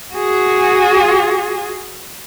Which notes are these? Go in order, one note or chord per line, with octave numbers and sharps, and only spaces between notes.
F#4 G#4